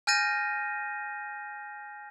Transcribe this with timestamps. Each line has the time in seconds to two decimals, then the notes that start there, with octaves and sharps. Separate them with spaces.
0.07 G#5 F6 G6 A6 A#6 D#7